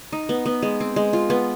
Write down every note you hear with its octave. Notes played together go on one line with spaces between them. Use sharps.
D#4
B3
B3
G#3
C4
G#3
F4
B3